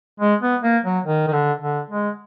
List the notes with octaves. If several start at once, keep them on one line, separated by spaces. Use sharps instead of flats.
G#3
B3
A#3
F#3
D#3
D#3
D3
D3
G#3